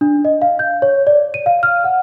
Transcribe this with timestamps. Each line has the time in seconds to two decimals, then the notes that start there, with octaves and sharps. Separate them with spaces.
0.01 D4
0.25 D#5
0.42 F5
0.59 G6
0.82 C#5
1.07 D5
1.34 D#7
1.46 F5
1.63 F6
1.84 F#5